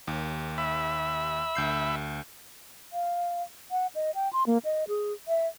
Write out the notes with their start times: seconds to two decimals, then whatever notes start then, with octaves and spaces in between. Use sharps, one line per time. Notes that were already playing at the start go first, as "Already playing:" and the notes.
0.08 D#2
0.58 E5 B5
1.55 D2 G6 C7
2.93 F5
3.71 F#5
3.95 D#5
4.15 G5
4.33 C6
4.47 A#3
4.65 D#5
4.88 G#4
5.28 E5